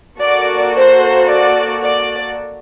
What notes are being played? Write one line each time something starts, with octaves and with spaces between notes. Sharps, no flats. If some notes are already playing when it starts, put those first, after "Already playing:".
A#3 F#4 A4 D5
C5
D5
D5